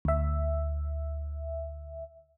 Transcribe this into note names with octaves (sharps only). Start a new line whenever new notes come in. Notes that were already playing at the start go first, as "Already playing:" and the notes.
D2 E5